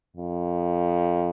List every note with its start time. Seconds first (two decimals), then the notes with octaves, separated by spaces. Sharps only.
0.16 F2